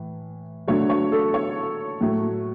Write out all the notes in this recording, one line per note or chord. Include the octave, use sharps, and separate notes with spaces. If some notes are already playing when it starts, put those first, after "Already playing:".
Already playing: A2 E3
D3 F#3 A3 C#5
C#5
A4
C#5
A2 F#3 A3